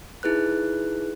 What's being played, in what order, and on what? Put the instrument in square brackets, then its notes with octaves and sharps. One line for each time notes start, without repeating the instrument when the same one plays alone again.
[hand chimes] D#4 E4 G#4 B4 F#6